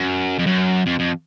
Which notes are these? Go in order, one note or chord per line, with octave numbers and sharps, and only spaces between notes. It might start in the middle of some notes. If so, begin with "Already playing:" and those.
Already playing: F#2
F2
F#2
F2
F2